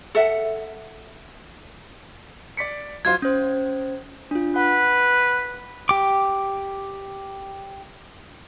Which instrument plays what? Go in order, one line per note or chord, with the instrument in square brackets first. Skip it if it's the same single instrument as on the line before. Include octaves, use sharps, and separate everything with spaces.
[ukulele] A4 E5 F#5
[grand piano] D5 B6 C#7
[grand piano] F#3 F4 C5 [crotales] G#6
[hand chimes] C#4 C5
D4 F4
[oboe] B4 [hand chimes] F#5
[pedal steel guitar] G4 D6